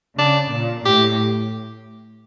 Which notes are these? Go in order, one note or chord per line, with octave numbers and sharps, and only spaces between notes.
C#3 D4
A#2
A2 G4